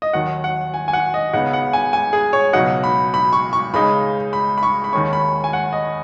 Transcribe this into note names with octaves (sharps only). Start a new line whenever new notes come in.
D#5
D#2 D#3 F#3 F#5
F#5
G#5
G#5
F#5
D#5
C#2 C#3 B3 D#4 F#5
F#5
G#5
G#5
G#4
C#5
C#2 B2 F#3 D#4 F#5
B5
B5
C#6
C#6
C#2 C#3 G#3 D#4 B5
B5
B5
C#6
B5
D#2 D#3 G#3 C#4 C#6
B5
G#5
F#5
D#5